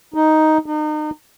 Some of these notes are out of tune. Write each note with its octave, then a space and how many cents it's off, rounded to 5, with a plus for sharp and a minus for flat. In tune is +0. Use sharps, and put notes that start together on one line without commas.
D#4 +5
D#4 -35